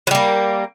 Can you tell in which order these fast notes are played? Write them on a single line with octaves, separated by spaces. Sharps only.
F#3 G3 A#3